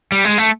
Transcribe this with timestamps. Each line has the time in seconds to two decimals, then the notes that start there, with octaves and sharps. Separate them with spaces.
0.12 G3
0.25 G#3
0.38 A3